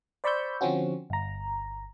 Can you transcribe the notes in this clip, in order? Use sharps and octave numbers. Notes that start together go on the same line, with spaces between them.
C5 D5 B5 C#6 E6 G6
D3 F3 C4 C#4 F#4
G1 A#5